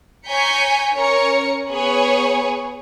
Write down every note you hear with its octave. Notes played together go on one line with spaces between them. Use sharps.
C#5 G#5 A#5 G6 B6 C#7
C#4 A#4 C#5 C#7
B3 G#4 B4 C#5 G#5 C#6